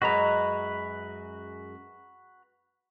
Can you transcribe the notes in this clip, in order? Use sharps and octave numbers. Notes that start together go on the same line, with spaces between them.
F#2 G#3 F#4 B4 A#5